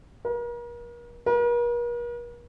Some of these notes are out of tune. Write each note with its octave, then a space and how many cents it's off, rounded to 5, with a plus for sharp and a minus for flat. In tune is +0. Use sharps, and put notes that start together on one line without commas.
A#4 +40
A#4 +45